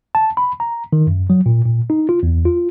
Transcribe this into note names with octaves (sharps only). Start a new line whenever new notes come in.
A5
B5
A#5
D#3
F#2
F#3
A#2
A#2
D#4
F4
E2
F4